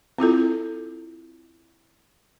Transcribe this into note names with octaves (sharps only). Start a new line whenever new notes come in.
C4 E4 F4 A4